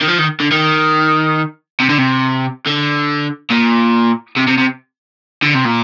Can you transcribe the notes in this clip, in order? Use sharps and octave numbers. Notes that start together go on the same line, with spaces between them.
D#3
F3
D#3
D3
D#3
C3
D3
C3
D3
A#2
C3
C3
C3
D3
C3
A#2